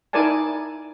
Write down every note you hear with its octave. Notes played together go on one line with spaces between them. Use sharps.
D#4 E4 A#4 D5 G#5 A5